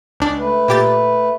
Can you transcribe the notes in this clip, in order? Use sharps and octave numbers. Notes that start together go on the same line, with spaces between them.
C#2 D4
A3 B4
A#2 G4 A6